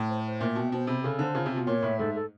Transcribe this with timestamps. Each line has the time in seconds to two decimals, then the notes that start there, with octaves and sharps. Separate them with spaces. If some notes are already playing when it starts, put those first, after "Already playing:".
Already playing: A2
0.08 C5
0.25 C5
0.40 A#2 E5
0.55 B2 G5
0.72 B2 C5
0.87 C3 B5
1.04 C#3 A4
1.19 D3 C5
1.35 C#3 F4
1.46 C3
1.51 B2 F4
1.66 A#2 C#5
1.82 A2 E5
1.99 G#2 A4
2.14 A4